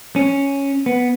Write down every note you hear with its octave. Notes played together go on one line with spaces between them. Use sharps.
C#4
B3